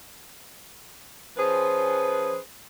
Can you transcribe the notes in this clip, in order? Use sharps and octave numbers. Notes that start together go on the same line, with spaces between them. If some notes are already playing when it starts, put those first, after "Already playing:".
F3 C#4 G#4 B4 C5